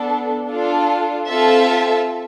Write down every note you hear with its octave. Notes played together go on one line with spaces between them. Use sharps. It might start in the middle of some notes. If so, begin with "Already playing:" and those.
Already playing: B3 D4 A4
D4 F4 A4
C4 F4 A4 E5 A5